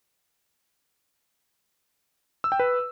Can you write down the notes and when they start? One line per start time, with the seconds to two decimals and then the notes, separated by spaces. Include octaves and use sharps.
2.44 E6
2.52 G5
2.60 B4